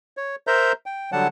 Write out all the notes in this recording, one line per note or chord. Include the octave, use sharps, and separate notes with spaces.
C#5
A#4 C5 E5 A#5 G6
G5
D3 F#3 G3 F#5 A5